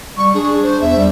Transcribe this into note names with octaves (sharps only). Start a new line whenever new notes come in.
G3 C#6
D4 G#4
C5
E2 E5
G3